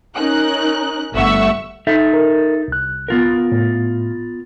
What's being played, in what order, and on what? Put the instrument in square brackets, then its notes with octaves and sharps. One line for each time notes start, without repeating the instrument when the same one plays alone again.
[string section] C#4 D#4 A#4 F#6
G1 A3 E5 F#5 C#6 E6
[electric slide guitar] D#4 A4 E5
[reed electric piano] A#4
C2 F#6
[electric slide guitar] B3 F4 A#4
[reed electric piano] A2